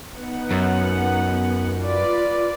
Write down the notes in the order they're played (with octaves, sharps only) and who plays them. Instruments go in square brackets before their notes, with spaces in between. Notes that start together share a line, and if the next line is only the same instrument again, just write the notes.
[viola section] B3 D#4 F#5
[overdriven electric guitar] F#2
[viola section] F4 B4 D5